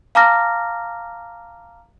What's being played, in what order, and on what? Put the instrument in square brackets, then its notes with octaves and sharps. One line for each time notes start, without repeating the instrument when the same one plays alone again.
[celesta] F5 A5 A#5 D6 F6 A#6